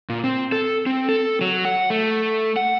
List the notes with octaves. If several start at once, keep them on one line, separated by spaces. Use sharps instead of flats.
A#2
C4
A4
C4
A4
F#3
F#5
A3
F#5